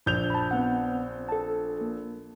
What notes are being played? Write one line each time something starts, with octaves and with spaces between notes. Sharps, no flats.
A#1 G6 F7
A5 B5
B3 C4 F#5
A4 A5
A#3